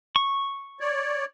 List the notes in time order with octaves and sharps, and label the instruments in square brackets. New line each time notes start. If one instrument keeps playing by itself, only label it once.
[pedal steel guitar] C#6
[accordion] C#5 D5